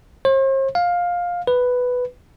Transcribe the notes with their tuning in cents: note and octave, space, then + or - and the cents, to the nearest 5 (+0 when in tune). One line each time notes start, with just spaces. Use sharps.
C5 +45
F5 +15
B4 +5